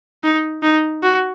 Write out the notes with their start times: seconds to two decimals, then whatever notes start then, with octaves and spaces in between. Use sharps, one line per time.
0.24 D#4
0.63 D#4
1.03 F#4